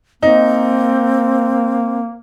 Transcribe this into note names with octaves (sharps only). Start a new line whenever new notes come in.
A#3 C4 D#4